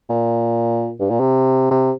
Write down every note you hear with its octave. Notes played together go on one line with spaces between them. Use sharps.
A#2
G2
A#2
C3
C3